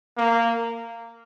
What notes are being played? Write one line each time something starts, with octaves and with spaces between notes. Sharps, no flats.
A#3